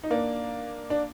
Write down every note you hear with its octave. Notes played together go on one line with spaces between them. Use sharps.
D#4
A#3 D4
D4